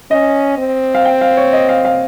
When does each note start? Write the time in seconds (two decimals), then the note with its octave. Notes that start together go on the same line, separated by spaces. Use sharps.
0.11 C#4 D#5
0.58 C4
0.95 F5
1.05 G5
1.21 F5
1.37 C#5
1.53 D#5
1.69 F5
1.85 F5